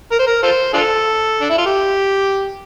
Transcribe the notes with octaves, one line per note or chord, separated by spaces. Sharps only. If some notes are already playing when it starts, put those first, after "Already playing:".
A#4
C5
A#4
F4 A4 C5
D4 F4 A4
D4
E4
F4
G4